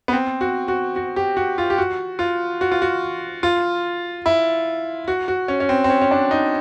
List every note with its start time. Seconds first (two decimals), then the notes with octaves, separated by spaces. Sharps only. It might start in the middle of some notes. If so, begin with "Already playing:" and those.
0.08 B3
0.13 C4
0.41 F#4
0.68 F#4
0.96 F#4
1.16 G4
1.37 F#4
1.58 F4
1.70 G4
1.78 F#4
2.19 F4
2.61 F#4
2.71 F4
2.82 F#4
3.43 F4
4.26 E4
5.08 F#4
5.28 F#4
5.48 C#4
5.60 C#4
5.69 C4
5.84 C4
5.90 C#4
6.02 C#4
6.11 D4
6.31 D#4